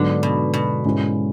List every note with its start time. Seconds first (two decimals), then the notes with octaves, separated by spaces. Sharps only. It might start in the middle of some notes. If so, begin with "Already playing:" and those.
Already playing: G#2 D3 F#3 B3 D4
0.23 B2
0.54 B2
0.85 G#2 G#3 C#4 E4